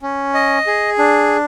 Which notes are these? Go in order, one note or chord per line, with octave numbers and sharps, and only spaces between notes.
C#4
D#5
G#4
D4